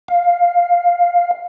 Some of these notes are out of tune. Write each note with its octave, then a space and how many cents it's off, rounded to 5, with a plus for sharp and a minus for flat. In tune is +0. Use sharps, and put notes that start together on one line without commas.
F5 +5